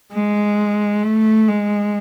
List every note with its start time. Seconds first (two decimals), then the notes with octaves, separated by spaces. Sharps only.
0.12 G#3
1.03 A3
1.48 G#3